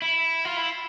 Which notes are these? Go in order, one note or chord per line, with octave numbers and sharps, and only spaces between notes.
E4
F4
E4